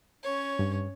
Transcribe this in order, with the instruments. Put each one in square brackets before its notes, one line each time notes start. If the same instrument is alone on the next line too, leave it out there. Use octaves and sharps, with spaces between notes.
[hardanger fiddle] C#4 C#5
[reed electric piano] G2